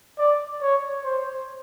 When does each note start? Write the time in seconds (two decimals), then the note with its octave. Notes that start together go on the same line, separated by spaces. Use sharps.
0.19 D5
0.62 C#5
1.04 C5